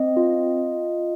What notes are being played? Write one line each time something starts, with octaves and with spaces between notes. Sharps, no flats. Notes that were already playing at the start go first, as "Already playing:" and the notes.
Already playing: C4 D#5
F4